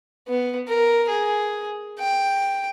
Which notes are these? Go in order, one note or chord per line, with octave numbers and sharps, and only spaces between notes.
B3
A#4
G#4
G5